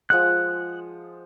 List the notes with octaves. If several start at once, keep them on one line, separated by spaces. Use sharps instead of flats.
F3 G#3 F#5 F#6